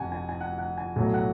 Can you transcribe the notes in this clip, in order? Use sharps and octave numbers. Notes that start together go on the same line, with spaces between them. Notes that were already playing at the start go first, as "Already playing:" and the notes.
Already playing: F1 F2 F#5 G#5
G#5
G#5
F#5
F#5
G#5
B1 A2 F#3 A3 G#5
F#5